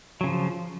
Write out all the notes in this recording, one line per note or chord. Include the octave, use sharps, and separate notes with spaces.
C#3 F3 F#3